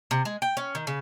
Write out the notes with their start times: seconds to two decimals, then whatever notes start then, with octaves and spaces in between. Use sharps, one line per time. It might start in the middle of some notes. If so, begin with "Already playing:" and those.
0.11 C3
0.25 G#3
0.42 G5
0.57 C#4
0.75 D#3
0.87 C#3